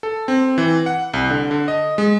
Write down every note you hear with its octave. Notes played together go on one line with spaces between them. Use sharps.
A4
C4
E3
F#5
C2
D3
D3
D#5
G#3